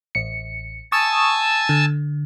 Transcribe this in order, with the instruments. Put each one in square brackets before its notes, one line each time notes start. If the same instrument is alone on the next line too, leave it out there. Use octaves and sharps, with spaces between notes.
[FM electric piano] A1 C#7
[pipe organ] G#5 A5 E6 [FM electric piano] C#6 D#6 A6
[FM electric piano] D3